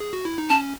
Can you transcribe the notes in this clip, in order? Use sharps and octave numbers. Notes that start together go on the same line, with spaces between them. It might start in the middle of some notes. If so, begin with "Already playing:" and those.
G#4
F#4
E4
D#4
C#4 A5